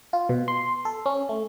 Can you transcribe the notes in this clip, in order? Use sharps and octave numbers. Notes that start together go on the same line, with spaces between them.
F4
B2
C6
A4
C#4
A3